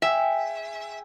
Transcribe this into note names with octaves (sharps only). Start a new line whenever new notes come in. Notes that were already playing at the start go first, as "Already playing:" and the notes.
G#4 E5 G5